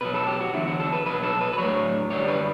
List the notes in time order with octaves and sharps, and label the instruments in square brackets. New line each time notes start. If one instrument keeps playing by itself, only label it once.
[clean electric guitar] B2 F#3 B4
A4
G4
F#4
E2 D3 F#3 E4
F#4
A4
B4
B2 F#3 B4
A4
B4
B4
A2 F#3 C#5
F#2 D3 G3 C#5
B4